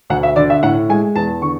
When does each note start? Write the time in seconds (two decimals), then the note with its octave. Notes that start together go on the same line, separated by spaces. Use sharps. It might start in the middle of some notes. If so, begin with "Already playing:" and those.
0.10 D2 F#5
0.23 E5
0.36 D3 D5
0.50 E5
0.63 A2 F#5
0.89 G#3 G#5
1.16 E2 A5
1.42 D3 C#6